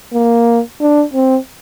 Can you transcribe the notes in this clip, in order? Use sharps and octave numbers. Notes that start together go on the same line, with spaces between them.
A#3
D4
C4